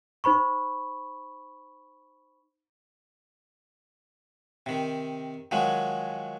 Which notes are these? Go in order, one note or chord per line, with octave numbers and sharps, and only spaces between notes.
D#4 C5 B5 C#6
C3 D#3
D#3 F3 F#3 G#3